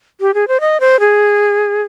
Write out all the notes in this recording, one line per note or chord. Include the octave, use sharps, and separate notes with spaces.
G4
G#4
C5
D#5
C5
G#4